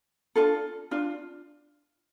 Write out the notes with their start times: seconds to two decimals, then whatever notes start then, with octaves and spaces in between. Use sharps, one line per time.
0.36 D4 F4 A4
0.91 D4 F4